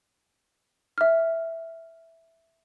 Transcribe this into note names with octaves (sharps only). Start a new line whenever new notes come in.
E5 F6